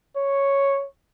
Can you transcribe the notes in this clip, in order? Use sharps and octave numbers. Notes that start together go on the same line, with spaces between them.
C#5